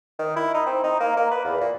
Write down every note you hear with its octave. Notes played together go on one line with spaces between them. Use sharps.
D#3
E4
D#4
C4
D#4
A#3
A#3
B4
E2
A#2